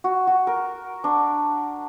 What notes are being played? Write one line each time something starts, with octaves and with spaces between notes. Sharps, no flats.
F#4
F#4
A#4
D4